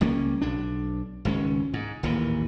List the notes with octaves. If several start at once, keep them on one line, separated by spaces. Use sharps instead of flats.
C#2 G3 A#3 C#4
B1 D4
G#1 C#2 D#3 C#4
G#2
A1 D#2 A#2 E3